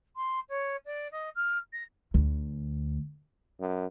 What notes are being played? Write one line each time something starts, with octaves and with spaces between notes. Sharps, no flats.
C6
C#5
D5
D#5
F6
A#6
D2
F#2